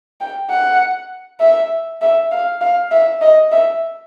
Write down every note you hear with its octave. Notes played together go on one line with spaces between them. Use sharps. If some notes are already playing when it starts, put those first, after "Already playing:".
G5
F#5
E5
E5
F5
F5
E5
D#5
E5